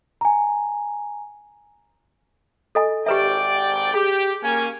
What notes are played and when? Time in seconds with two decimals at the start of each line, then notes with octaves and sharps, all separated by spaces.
0.21 G#5 A#5
2.75 A4 D#5 G#5
3.06 G#1 G4 B4 D5 E5 G5
3.94 G4 G#4 D6
4.43 A#3 C#4 G#5